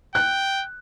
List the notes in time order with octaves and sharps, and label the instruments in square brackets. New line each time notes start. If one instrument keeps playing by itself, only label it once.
[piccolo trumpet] G5 [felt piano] F#6